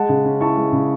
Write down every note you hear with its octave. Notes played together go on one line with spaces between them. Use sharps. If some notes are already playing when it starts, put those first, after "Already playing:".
Already playing: G#3 F#5 A5
C#3
C#4
E4 A5 C#6
G#3
C#3